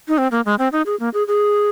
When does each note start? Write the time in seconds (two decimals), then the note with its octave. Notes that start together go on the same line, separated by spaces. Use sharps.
0.08 D#4
0.18 C4
0.31 A#3
0.46 G#3
0.59 C4
0.72 D#4
0.86 G#4
1.00 A#3
1.14 G#4
1.27 G#4